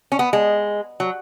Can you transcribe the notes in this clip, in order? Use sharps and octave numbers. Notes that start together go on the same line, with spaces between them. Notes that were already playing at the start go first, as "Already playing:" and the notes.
C#4
B3
G#3
F#3